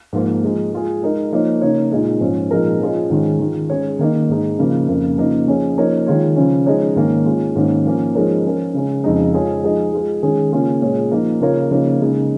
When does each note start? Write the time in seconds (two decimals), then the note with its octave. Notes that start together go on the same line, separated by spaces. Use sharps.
0.13 G#2 F3 A#3 F4
0.44 F3 G#3 D#4
0.72 G#3 F4 G#4
1.03 G#3 D#4 A#4
1.32 F3 A#3 D#4 C#5
1.61 C#3 A#3 D#4 C#5
1.92 A#2 G#3 D#4
2.21 G#2 F3 C#4
2.51 A#2 F3 G#3 D#4 A#4
2.80 F3 C#4 F4 G#4 D#5
3.10 G#2 D#3 G#3 C#4 F4
3.39 D#3 G#3 F4
3.70 G#3 C#4 G#4 C#5
3.99 D#3 A#3 D#4
4.29 G#2 G#3 D#4
4.59 C#3 F3 A#3
4.88 F2 C#3 A#3
5.18 C#3 F3 A#3 D#4
5.48 F3 C#4 G#4 C#5
5.77 F3 A#3 D#4 A#4 C#5
6.07 D#3 G#3 F4 C#5
6.36 C#3 F3 C#4
6.66 F3 G#3 D#4 C#5
6.96 G#2 D#3 A#3 C#4
7.26 G#3 C#4 F4
7.56 G#2 D#3 A#3 C#4
7.85 F3 A#3 C#4
8.15 F3 G#3 D#4 A#4 C#5
8.45 F3 C#4 A#4
8.74 C#3 G#3 C#4
9.04 F2 C#3 G#3 D#4
9.33 G#3 F4 G#4 C#5
9.63 F3 G#3 D#4 G#4 D#5
9.93 G#3 F4 G#4
10.23 D#3 G#3 C#4 G#4
10.52 C#3 A#3 C#4 F4 G#4
10.82 A#2 G#3 C#4 G#4 C#5
11.11 F3 A#3 D#4
11.41 C#3 A#3 F4 A#4 C#5
11.71 C#3 F3 A#3 D#4 C#5
12.01 C#3 G#3 D#4